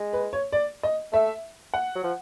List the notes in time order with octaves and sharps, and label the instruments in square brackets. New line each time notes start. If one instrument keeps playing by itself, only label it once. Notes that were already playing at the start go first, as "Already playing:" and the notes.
Already playing: [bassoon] G#3
[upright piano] B4
C#5
D5
D#5
[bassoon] A3 [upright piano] E5
[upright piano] F#5
[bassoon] F#3
F3